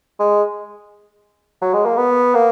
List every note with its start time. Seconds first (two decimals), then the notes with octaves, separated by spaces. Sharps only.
0.19 G#3
1.62 F#3
1.73 G#3
1.85 A#3
1.97 B3
2.34 A#3